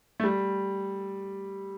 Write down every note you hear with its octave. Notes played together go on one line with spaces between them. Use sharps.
A3
G3